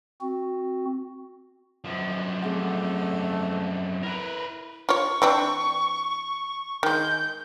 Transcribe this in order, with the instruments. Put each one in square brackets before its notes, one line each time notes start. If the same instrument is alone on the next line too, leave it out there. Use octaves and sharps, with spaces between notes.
[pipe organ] C4 F#4
[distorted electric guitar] F#2 F3
[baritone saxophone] A3 [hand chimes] C4 G#4 F#5
[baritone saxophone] E4 [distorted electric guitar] A#4 B4
[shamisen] F4 C#5 [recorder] C#6
[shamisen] E3 C4 D4
[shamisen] D#3 G#3 [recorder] G6